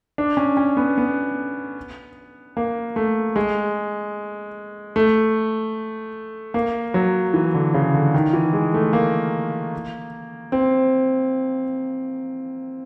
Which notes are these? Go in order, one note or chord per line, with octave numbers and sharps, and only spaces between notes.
D4
C#4
C#4
B3
B3
A#3
A3
G#3
A3
A#3
F#3
E3
D3
C#3
D3
D#3
E3
G#3
A3
A#3
C4